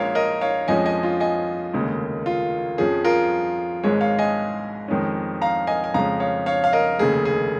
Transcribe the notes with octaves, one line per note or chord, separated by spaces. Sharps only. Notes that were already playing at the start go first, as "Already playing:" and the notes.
Already playing: A#1 A#2 G#3 C#4 A#4 C#5 F5
A#4 D#5
C#5 F5
F2 F3 G#3 C#4 D#5 G#5
D#5 G#5
F4
D#5 G#5
F1 D#2 C#3 G#3
F4
F2 F3 C#4 G#4
F4 A#4
G#1 G#2 G#3 G#4 C#5
C#5 F5
D#5 G#5
F2 D#3 G#3 C#4
F5 A#5
D#5 G#5
G#5
F2 C#3 G#3 C#4 F5 A#5
C#5 F5
C#5 F5
F5
A#4 D#5
F1 D#2 C#3 G#4
G#4